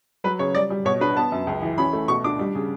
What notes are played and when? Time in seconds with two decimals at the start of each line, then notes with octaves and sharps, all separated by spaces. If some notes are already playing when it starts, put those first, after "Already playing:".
0.24 F#3 B4
0.39 C#3 C#5
0.55 G3 D5
0.70 G3
0.85 B2 C#5
1.00 D4 B4
1.16 B3 A5
1.32 F#2
1.47 C#2
1.62 E3
1.78 C#4 B5
1.93 A3
2.08 B2 C#6
2.24 D4 D6
2.39 G3
2.55 C#3